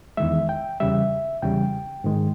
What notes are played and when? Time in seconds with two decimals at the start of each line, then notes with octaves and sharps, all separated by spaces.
0.17 E2 D#3 G#3 E5
0.49 G5
0.80 E2 C#3 G3 E5
1.42 E2 C#3 G3 G5
2.04 G#2 D#3 G#3